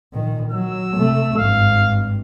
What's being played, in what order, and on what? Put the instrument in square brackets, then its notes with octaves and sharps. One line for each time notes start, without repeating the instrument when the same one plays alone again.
[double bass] A#2 D#3
[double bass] F#3 [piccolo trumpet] E6
[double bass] C3 A3
[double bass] G#1 G2 [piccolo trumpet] F5